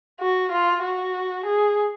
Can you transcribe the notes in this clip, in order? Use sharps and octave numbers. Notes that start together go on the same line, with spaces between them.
F#4
F4
F#4
G#4